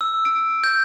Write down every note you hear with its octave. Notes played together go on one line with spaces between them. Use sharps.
E6
D7
G6